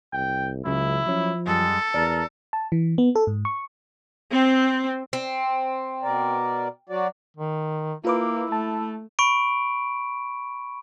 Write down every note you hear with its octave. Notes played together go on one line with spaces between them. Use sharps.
C2 G5
C#2 C#3 F#3 E4
F3 F#3 C#4
F#2 G3 G#3 A4
E2 A#4 D5
A5
E3
B3
A4
G#2
C#6
C4
C4
B2 A#4 D5
F#3 F#4 D5
D#3
A#3 E4 F4 B4 D6
A3 A5
B5 C#6 D7